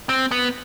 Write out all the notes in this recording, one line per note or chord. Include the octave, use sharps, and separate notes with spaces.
C4
B3